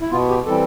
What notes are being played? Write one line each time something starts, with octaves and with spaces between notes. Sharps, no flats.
E4
B2 B3 F4
G4
E3 G3 C4 A4